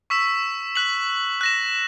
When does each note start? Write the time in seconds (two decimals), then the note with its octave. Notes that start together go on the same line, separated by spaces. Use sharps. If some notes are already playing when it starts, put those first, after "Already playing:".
0.10 C#6 E6 B6 E7
0.75 F#6 B6 F#7
1.41 F#6 A#6 E7